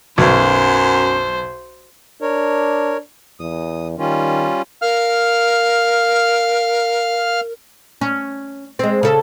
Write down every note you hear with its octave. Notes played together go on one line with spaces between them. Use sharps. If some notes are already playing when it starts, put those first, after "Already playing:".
B1 F#2 C5
D4 A#4 C#5
E2 D#6
D#3 G3 C#4 F4
A#4 F5 F6
C#4
G#3 C4
C#3 A4